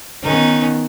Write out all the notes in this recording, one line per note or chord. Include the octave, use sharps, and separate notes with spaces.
D#3 B3 C#4 D#4